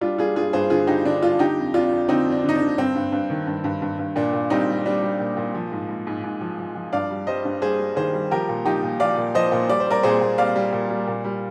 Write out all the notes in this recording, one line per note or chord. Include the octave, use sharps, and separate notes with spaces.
G3 D4 F4
G3 F4 G#4
G2 F4 G#4
G2 G#4 C5
D3 F4 G#4
D3 D#4 G4
D3 D4
G2 D4 F4
D3 D#4 G4
F2
F2 D4 F4
F2
D3 C4 D#4
F2
D4
D3
D#4
D4
D3
G2 C4
G2
G2
D#3
G2
G2
G2
G2
A#2 D4
A#2
G3 C4 D#4
G3
G3 D4
G3
A#2
A#2
F3
G#2
G#2
G#2
G#2
F3
F3
F3
G2 D5 F5
G3
G3 C5 D#5
G2
G3 G#4 C5
G3
D#3 G#4 C5
G3
F3 G4 A#4
A#2
F3 D#4 G4
A#2
F3 D5 F5
A#2
F3 C5 D#5
A#2
G3 D5
C5
G3 A#4 D5
A#2 G#4 C5
A#2
G3 D5 F5
G3
A#2
G3
A#2
G3